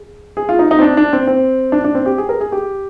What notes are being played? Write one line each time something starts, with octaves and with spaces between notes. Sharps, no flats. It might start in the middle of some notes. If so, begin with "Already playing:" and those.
Already playing: G#4
G#4
F4
D#4
D#4
C4
D4
D4
C4
C4
D4
D4
C4
G4
G#4
A#4
G#4
G4